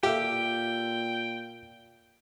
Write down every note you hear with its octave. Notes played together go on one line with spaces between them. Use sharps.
A#2 F4 G4 A4 E5 G5